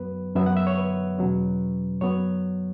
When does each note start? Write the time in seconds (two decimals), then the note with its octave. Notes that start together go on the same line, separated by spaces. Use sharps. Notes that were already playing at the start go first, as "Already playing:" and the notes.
Already playing: F#2 F#3 B3 B4
0.35 F#2 F#3 B3 E5
0.46 F#5
0.57 E5
0.67 C#5
0.78 B4
1.18 E2 B2 F#3 C#4
2.01 F#2 F#3 B3 C#5